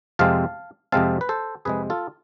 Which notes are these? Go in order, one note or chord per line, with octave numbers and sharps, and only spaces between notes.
F2 C3 G#3 C4 F5 A5
F2 C3 G#3 C4 F5 A5
B4
A4 C5
F2 C3 G#3 G#4 B4
F4 A4